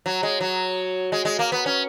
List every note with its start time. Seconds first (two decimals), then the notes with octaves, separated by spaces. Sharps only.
0.06 F#3
0.23 G#3
0.41 F#3
1.12 G#3
1.25 G#3
1.39 A#3
1.52 B3
1.66 C#4